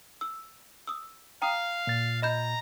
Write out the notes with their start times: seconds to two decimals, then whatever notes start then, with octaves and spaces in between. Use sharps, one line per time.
0.21 E6
0.87 D#6 E6
1.42 F5 G5 A#5 D#6
1.87 A#2 A6
2.22 D#5 A#5 B5 G6